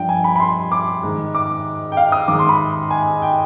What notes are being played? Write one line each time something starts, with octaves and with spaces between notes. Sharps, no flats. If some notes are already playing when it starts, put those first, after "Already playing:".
Already playing: G2 F3 G5
G#5
B5
B5
C6
D6
G#2 D#3
D6
G5
F5
D#6
G#2 D#3 D6
C6
B5
G#5
G5